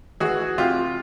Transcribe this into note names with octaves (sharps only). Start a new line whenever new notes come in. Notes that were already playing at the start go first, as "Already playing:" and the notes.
E3 F#4 G#4
C3 F4 G4